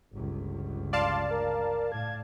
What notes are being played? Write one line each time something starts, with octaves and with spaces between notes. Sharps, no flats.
G1 C#2
D5 F5 A5 C6
A#4
A2 G#6